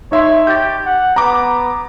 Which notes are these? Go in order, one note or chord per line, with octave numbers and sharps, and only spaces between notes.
D#4 C#5 E5 C6
G4 G6 A6
F#5
B3 A#5 D6